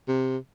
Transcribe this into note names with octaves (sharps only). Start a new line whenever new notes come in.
C3